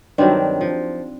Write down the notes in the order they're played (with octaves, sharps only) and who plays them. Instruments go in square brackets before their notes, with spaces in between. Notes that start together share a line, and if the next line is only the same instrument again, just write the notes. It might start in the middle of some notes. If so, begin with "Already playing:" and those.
[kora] G2 D#3 F#3 C4 D4
F3